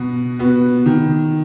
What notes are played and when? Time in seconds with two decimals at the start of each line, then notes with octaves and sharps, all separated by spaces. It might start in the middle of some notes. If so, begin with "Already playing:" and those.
Already playing: B2 B3 F#4
0.39 B3 F#4
0.86 D#3